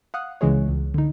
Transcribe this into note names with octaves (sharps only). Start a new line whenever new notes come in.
F5 F#5 D#6 F#6
C#2 C#3 E3 G#3 G#4 C#5
C#2
D3 D#4